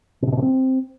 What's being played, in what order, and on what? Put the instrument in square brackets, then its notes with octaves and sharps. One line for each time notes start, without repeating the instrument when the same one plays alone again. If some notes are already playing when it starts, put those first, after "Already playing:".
[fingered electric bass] B2
C3
B2
C3
C4